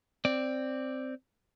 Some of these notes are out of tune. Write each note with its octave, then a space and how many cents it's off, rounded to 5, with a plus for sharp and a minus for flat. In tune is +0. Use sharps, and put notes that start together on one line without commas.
C4 +0 D5 +0